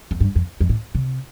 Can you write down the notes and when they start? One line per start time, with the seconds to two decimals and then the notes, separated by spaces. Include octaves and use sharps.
0.11 F2
0.20 G2
0.35 F2
0.61 F2
0.69 A2
0.95 C3